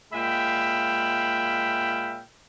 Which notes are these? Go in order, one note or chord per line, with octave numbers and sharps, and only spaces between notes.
A#2 G#3 E5 F5 G5 B5